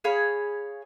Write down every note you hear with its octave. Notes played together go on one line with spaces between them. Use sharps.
G#4 C#5 F5 B5